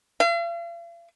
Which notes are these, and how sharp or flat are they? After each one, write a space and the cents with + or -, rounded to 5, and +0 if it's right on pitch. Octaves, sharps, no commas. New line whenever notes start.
F5 -45